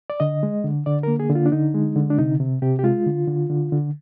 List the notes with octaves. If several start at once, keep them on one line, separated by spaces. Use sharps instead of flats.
D5
D3 D#5
G#3
D3
D3 D5
A#3 A#4
G#4
D3
F4
D4
D3 D#4
G#3
D3
D4
C3 D#4
C3
C3 G4
G4
G#3 F4
D3
D3
D3
D3